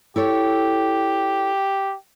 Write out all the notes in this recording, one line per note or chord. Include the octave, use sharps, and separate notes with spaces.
E4 G4 A4 C#5